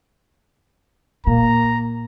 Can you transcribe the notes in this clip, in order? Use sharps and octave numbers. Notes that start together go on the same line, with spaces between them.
A#2 A#3 A#5